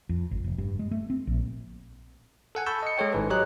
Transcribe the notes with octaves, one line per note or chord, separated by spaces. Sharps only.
F2
G#1
F1
G2
G#3
A3
C4
A#1
A4 F#5 G#5
A5 B5 C#6 E6 G6
D#5 C#7
G#3 A4 C#5 G5
G#1 G#2 B4
F#3 G4 C#5 D#5 A#5 F#6